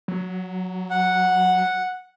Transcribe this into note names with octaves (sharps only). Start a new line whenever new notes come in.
F#3
F#5